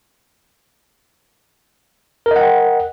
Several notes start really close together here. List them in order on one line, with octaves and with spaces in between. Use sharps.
A#4 D#5 F#5 G5